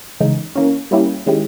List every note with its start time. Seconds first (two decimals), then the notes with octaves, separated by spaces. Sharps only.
0.21 C#3 E3 G#3 D#4
0.56 E3 A#3 C#4
0.91 G3 A#3 C#4 E4 G4
1.26 D#3 G#3 C#4 E4 G4